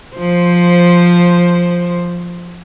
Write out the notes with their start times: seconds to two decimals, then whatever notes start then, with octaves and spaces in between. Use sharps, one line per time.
0.16 F3 C5